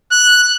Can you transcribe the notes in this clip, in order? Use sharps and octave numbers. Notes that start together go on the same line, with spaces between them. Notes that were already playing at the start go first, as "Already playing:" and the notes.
F#6